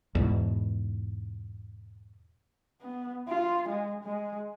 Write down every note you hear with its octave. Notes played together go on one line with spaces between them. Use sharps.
E2 G#2 B2
B3
F4
G#3
G#3